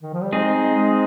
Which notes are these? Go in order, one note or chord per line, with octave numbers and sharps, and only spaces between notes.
D#3
F3
G3
G#3 C4 D#4 G#4
G#3
G#3